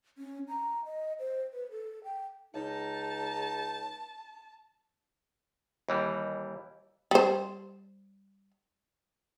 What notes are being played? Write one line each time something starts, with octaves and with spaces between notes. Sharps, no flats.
C#4
A#5
D#5
C5
B4
A4
G5
C#2 D#4 A5
D#2 E3 G3
G3 C5